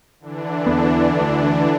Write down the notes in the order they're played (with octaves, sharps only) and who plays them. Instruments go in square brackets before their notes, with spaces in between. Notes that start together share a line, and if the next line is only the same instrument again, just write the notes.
[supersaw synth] D3 E3 D4
[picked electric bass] E2 B3
D2